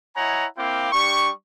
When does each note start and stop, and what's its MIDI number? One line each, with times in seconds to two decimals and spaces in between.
0.17 0.46 64
0.17 0.46 73
0.17 0.46 75
0.17 0.46 78
0.17 0.46 80
0.17 0.46 82
0.58 0.92 58
0.58 0.92 60
0.58 0.92 64
0.58 0.92 77
0.58 0.92 79
0.58 0.92 86
0.92 1.31 55
0.92 1.31 62
0.92 1.31 67
0.92 1.31 85